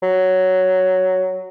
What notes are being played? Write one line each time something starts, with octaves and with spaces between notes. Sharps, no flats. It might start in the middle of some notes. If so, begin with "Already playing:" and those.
F#3